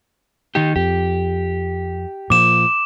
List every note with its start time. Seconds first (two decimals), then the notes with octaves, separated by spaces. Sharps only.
0.55 D#3 D#4 G4
0.76 F2 G4
2.30 A#2 F3 D6 E7